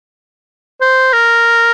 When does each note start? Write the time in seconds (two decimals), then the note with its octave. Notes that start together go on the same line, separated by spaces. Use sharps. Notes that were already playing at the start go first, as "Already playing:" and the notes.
0.81 C5
1.13 A#4